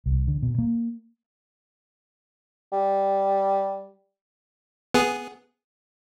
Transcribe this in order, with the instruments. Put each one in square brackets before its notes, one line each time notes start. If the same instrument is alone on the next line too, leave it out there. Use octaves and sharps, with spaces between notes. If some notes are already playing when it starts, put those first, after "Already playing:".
[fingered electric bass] C2
D3
B2
A#3
[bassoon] G3
[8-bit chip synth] B3 G#4